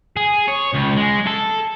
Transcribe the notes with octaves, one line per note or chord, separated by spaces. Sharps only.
G#4
C#5
C#2
G#3
A4